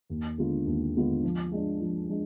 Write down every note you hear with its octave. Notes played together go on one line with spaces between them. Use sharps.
D#2
D3 G#3 B3 F4
D#2
D3 G#3 B3 F4
F3
G#3 D4
F3
G#3 D4